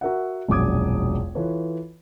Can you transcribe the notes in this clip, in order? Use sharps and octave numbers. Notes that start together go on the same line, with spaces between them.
F#4 A#4 E5 F#5
E1 A#1 F#2 D6 D#6 G#6
E3 F4 A4 B4 C#5